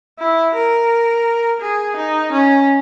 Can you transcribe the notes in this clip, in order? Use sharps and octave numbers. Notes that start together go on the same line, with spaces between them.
E4
A#4
G#4
D#4
C#4